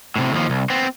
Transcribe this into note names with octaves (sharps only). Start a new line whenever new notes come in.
A2 C3
D#2 F3
C2
B3 C4